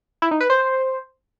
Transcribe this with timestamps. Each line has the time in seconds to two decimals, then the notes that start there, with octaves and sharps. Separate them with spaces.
0.22 E4
0.31 D#4
0.40 B4
0.50 C5